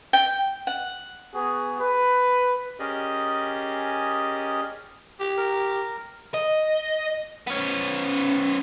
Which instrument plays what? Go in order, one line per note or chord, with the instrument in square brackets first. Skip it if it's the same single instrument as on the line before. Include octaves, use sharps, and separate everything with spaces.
[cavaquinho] G5
F#5
[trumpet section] B3 F#4 G#4
B4
[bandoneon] C#4 G4 G#4 A#4 D5 D#5
[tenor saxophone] G4
[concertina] A#4
[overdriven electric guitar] D#5
B3 C#4